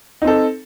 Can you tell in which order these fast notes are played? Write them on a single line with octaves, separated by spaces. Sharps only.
D#4 C4 A4